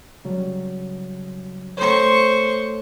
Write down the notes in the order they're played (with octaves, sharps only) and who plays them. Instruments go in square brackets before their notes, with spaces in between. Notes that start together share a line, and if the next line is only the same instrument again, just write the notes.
[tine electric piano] C#3 F#3 G3
[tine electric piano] A3 A4 C#5 [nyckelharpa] C5 C#6